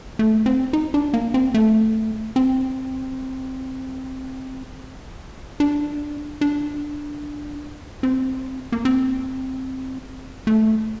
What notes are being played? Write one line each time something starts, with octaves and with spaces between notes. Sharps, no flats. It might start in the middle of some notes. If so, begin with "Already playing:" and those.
A3
C4
D#4
D4
A#3
C4
A3
C4
D4
D4
C4
A#3
C4
A3